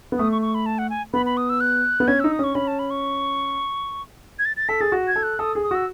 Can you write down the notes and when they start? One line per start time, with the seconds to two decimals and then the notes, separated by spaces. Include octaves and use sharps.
0.12 B3
0.18 A3 D#6
0.31 C#6
0.42 C#6
0.55 B5
0.66 A5
0.78 F#5
0.90 G#5
1.14 B3 B5
1.26 B5
1.37 D#6
1.49 E6
1.60 F#6
2.00 B3
2.08 C#4 G#6
2.20 D#4 E6
2.32 D#6
2.39 C#4 C#6
2.55 C#4 B5
2.67 A5
2.79 B5
2.90 C#6
4.39 G#6
4.45 A6
4.57 A6
4.69 A4 B6
4.81 G#4 A6
4.92 F#4
5.08 G#6
5.16 A4
5.23 F#6
5.39 A4 D#6
5.55 G#4
5.63 D#6
5.71 F#4 E6